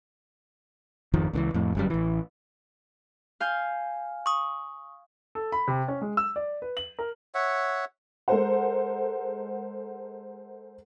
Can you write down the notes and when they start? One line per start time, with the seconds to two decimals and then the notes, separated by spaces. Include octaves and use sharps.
1.13 G#1 F2 D#3 F3
1.33 C#2 D3 E3
1.54 F2 A2
1.75 G1 F#2 G3
1.90 A1 E3
3.40 F5 G#5 G6
4.26 C#6 D#6
5.35 A4
5.52 B5
5.68 C3
5.88 C#4
6.01 G#3
6.17 E6
6.36 D5
6.62 B4
6.77 F#7
6.99 A#4
7.34 C#5 E5 F#5
8.28 G#3 A4 A#4 C5 F#5